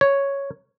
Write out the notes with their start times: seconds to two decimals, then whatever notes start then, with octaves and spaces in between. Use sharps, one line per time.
0.01 C#5